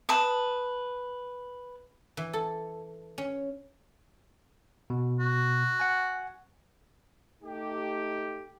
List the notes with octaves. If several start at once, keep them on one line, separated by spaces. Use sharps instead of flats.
B4 A5 D#6
E3
A4
C#4
B2
F#4
F#5 G#5
A3 D#4 G4